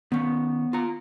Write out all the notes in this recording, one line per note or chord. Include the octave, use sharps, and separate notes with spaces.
D#3 B3 C#4
F4 A#5